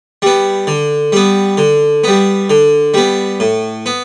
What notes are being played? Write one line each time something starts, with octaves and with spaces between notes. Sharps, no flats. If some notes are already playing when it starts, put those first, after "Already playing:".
G3 B3
D3
G3 B3
D3
G3 B3
D3
G3 B3
A2
B3